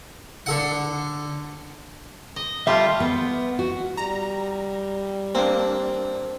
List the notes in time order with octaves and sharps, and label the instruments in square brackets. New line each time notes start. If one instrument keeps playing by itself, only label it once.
[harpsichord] D3 A4 F#5
[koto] D#5
[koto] G3 A3 F4 [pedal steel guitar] E5 A5 F6
[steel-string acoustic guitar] B3
F#4
[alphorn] G3 [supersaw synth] A#5
[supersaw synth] A#3 D4 [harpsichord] C4